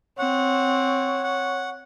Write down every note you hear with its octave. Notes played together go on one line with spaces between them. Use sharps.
C4 C#5 F#5
F#5